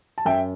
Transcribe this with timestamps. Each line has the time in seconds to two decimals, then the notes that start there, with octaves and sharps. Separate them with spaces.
0.18 A5
0.25 F#2 E5 G5